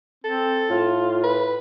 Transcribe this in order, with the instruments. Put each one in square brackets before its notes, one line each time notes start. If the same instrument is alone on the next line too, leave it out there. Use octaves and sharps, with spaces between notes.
[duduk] C4 [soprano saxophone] A4
[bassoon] A2 [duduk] F4
[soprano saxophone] B4